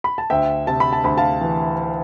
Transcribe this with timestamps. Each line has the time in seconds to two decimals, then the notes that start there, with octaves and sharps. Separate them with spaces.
0.04 B5
0.18 A5
0.30 D2 E5 G5
0.67 C3 A5
0.80 B5
0.93 A5
1.04 D2 B5
1.17 F5 A5
1.41 E3